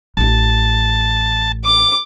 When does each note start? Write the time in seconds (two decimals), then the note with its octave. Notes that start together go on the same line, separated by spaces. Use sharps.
0.17 A1 D4 A5
1.64 D6